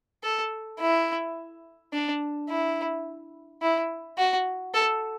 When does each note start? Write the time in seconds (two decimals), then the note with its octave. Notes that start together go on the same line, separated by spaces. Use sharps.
0.23 A4
0.80 E4
1.93 D4
2.49 E4
3.62 E4
4.18 F#4
4.74 A4